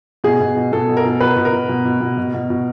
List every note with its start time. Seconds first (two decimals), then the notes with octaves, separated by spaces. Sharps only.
0.24 B2 G#4
0.40 B2
0.57 B2
0.72 B2 A4
0.89 B2
0.97 A#4
1.05 B2
1.20 B2 B4
1.36 B2
1.45 A#4
1.53 B2
1.69 B2
1.85 B2
2.01 B2
2.17 B2
2.34 B2
2.50 B2